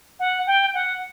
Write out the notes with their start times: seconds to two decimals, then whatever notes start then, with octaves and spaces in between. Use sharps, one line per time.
0.19 F#5
0.47 G5
0.74 F#5